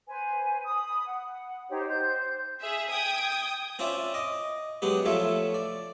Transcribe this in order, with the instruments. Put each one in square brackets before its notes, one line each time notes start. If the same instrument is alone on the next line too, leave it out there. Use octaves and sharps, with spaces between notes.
[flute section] B4 C5 G#5
B5 D#6
F#5
D#4 G4 C5 C#5
C5 G6
[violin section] G#4 E5
G5 D#6 G#6
[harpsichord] C4 C#4 F4 D5 E5
D#5 D6
F#3 G#3 B3 G4
F3 A3 F4 C#5 E5
D5